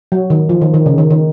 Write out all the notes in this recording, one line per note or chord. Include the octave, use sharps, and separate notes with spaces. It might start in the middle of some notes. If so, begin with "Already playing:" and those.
F#3
D#3
F3
D#3
D#3
C#3
D#3
D#3